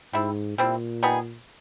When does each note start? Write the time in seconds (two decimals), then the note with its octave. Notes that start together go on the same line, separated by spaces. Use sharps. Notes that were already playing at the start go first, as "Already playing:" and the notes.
0.13 G#2 G3 C4 E4
0.58 A#2 G3 C4 E4
1.03 G3 B3 D#4 G#4